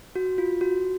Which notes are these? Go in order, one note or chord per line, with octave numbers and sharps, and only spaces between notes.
F#4
F4
F#4